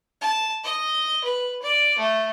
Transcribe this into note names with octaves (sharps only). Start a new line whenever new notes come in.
A5
D#5
B4
D5
A3